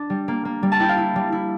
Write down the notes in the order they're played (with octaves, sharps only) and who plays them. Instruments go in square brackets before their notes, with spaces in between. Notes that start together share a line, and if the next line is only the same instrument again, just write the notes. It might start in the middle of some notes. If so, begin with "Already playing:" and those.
Already playing: [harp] D4
G3
A#3
A#3
G3
A5
E4 G5
F5
E4
G3
E4